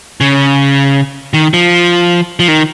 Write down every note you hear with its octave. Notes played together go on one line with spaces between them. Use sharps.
C#3
D#3
F3
F3
D#3